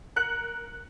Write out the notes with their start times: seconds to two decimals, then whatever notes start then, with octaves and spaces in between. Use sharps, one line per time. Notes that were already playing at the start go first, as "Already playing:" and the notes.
0.16 A#4 F#6 C#7 F#7